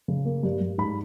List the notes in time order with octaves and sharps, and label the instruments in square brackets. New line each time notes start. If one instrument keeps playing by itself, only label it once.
[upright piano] C#3
A#3
G2
G2
G#2 B5